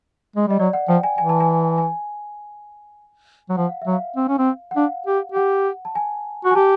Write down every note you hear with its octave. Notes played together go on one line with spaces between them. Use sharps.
G#3
G3 D#5
F#3 D5
F#5
F3 G5
G#5
E3 G#5
A5
G#5
G#5
F#3
F3 F#5
F5
E5
F#3
F5
C4
C#4
C4
F#5
D4 F5
G4
G4 F#5
A5
G#5
F#4
G#5
G4 A5